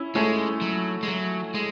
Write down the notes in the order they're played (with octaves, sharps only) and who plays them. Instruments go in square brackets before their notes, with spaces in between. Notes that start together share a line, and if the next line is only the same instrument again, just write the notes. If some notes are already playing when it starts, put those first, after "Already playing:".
Already playing: [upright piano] C#4 E4
[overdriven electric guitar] G#3 [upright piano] A3 C#4
[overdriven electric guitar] F#3
G#3
F#3
G#3